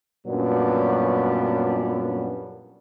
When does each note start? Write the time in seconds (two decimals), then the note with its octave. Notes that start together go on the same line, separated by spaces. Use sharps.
0.27 F#2 A#2 F#3 G3 B3 D4